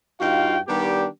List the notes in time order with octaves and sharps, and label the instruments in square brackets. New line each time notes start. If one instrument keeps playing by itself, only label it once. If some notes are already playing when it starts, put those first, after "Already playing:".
[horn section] G2 D#4 F4 F#4 F5 G5
D#3 G3 B3 D4 G4